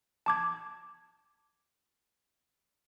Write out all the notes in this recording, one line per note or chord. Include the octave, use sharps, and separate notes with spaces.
A5 D6 G#6